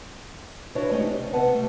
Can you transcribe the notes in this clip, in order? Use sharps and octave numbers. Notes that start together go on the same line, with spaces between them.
D4 E4 F#4 B4 C#5 D5
G#3 A3 C4 C#4 D#4 G4
G4
C3 D#3
C3 B3 B4 F#5 A5
G3 A3